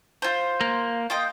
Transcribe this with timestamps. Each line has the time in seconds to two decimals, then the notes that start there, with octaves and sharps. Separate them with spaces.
0.22 F4 C5
0.61 A#3
1.10 F4 D#5 G5